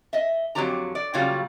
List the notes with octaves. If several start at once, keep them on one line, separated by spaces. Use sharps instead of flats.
D#5 E5
F2 D3 F#3 C4 G4 A#5
D5
A#2 C#3 F#3 G3 F4